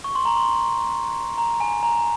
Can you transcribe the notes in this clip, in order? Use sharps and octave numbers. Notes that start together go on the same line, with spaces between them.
C#6
C6
A#5
C6
A#5
G#5
A#5